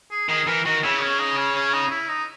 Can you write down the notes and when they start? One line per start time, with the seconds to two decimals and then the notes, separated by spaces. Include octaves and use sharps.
0.11 G#4
0.29 D#3 G#4
0.47 E3 A#4
0.65 D#3 F#4
0.83 C#3 E4
1.01 C#4
1.20 D#4
1.37 C#4
1.55 C#4
1.74 D#4
1.90 E4
2.09 D#4